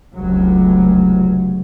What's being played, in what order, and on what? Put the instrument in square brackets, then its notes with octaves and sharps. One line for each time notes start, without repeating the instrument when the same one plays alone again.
[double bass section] F1 C#2 F#3